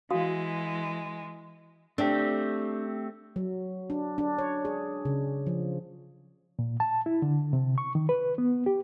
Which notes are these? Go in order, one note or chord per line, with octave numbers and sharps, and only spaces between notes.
E3 G#3 F#4 F5 D#6
A3 C4 D4 G4
F#3
D4
D4
C#5
G#4
C#3
F3
A#2
A5
E4
D3
C3
C#6
D#3
B4
B3
G4